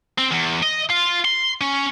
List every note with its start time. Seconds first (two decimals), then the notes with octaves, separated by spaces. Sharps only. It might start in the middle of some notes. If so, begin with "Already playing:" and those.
0.18 C4
0.32 E2
0.63 D#5
0.90 F4
1.25 C6
1.61 C#4